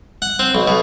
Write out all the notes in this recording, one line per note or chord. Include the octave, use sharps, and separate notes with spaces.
F#5
C4
B1
B2